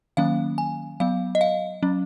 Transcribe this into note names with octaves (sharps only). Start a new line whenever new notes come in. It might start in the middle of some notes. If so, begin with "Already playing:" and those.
D#3 F#3 A#3 C#4 F5
G#5
F#3 B3 F5
D#5
F5
F#3 C#4